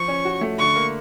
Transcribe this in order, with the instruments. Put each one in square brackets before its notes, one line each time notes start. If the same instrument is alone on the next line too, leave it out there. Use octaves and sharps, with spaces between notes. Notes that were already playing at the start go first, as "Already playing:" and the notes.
Already playing: [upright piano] F3 [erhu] C#6
[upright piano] C#4
F#4
A3
[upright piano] D3 [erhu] C#6
[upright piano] A#3